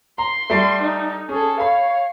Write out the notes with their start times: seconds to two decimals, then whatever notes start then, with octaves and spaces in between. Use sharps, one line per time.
0.18 A#5 C6
0.50 G3 A3
0.82 D#4
1.29 C#4 G#4 A4
1.60 C#5 F5 B5